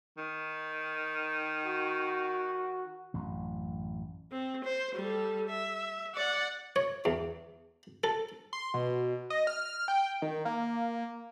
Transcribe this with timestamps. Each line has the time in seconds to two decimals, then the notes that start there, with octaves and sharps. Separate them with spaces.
0.18 D#3
1.65 F#4
3.14 A1 F#2
4.32 C4
4.65 C5
4.95 G3 A4
5.49 E5
6.15 D5 F#5
6.76 C#5
7.05 E2
8.04 A4
8.53 C6
8.74 B2
9.30 D#5
9.47 F6
9.88 G5
10.22 D#3
10.45 A#3